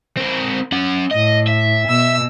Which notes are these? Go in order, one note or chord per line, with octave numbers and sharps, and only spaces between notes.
C4 A#4
C#4 F#5
A2 D#5
E5
B2 E6